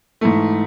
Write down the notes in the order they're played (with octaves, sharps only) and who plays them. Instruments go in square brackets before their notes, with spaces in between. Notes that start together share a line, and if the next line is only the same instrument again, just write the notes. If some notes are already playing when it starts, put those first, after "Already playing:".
[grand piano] G#2 E3 A3